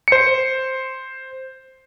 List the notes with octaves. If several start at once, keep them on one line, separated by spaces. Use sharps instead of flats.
C5 C#7